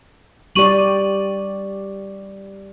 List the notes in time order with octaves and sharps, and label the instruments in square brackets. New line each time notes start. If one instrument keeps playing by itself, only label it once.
[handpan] G3 G4 D5 [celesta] C#6 D#7 F#7